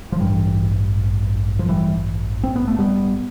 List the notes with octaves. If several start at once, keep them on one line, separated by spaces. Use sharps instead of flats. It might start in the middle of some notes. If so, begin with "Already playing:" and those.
F3
A1 G2 D3 E3 G3
F3
E3 G3
C4
B3
A3
G3 B3